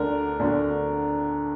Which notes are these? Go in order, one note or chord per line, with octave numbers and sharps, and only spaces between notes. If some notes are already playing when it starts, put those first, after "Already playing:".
Already playing: D2 D3 A#4
D2 D3